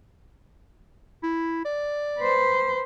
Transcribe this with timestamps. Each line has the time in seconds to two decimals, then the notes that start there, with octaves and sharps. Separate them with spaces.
1.23 E4
1.65 D5
2.19 B4 C5